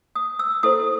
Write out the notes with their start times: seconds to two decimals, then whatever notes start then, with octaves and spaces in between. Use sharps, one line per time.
0.15 D#6
0.39 E6
0.63 E4 A4 C5 D#6